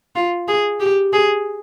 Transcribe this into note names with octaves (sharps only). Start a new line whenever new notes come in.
F4
G#4
G4
G#4